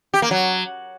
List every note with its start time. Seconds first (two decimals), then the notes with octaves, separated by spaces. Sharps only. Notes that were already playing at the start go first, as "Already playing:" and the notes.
0.14 G4
0.22 A#3
0.31 F#3